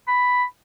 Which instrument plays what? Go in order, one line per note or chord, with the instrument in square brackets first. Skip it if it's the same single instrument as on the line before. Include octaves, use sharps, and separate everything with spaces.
[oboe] B5